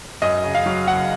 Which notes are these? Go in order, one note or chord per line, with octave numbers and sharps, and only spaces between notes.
F#2 D#5
C#3
F5
F#3
F#1 F#5